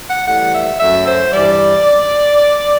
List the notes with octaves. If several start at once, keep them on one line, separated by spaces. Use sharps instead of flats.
F#5
A2 E3 G3 F#5
E5
F#2 F#3 A3 E5
C5
G2 E3 G3 D5